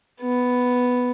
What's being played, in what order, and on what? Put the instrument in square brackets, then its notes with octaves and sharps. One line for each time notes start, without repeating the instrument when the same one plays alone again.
[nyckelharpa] B3